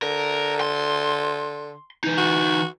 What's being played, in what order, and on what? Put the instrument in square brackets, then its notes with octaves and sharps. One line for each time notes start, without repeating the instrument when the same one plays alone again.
[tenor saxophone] D3 [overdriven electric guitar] A#4
[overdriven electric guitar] C6
E3 D#4
[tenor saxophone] F#4